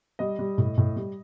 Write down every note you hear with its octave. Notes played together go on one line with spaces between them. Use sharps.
G3 D#5
G3
A2
A2
G3